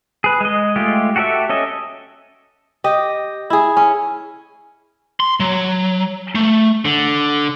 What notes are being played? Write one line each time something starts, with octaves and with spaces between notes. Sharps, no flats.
G#4 B4
G#3 D#5
G#3 A3 F4 G4
F#4 G4 A4 D5 E5
C#4 A4 D#5 E5
G4 D#5
E4 G#4
C#4
C6
F#3
A3
D3